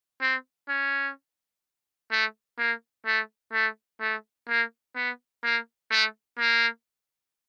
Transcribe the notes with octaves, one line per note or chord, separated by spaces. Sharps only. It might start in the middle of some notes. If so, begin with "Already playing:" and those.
C4
C#4
A3
A#3
A3
A3
A3
A#3
B3
A#3
A3
A#3